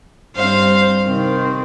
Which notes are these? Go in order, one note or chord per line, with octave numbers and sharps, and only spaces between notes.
G2 G3 C4 C5 F5
C3 D#3 C4